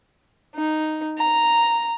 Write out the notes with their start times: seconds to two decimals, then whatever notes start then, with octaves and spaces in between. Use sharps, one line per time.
0.56 D#4
1.18 A#5